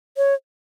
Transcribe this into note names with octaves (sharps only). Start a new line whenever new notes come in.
C#5